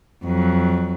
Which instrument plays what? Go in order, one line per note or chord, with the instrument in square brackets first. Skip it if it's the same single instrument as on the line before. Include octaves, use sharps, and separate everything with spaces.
[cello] F2 F#3